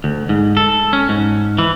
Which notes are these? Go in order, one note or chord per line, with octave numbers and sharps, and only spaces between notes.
D2
G#2
A4
C#4
G#2
E3